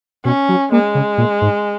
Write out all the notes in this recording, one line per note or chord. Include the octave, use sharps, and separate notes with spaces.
B2 C#4
F#3
G#3 A#3
C#3
A#2
G#2